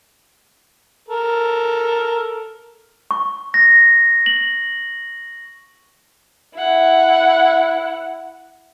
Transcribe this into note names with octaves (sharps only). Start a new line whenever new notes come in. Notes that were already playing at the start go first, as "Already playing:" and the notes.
A4 A#4
C#6
A#6
F#7
E4 F#5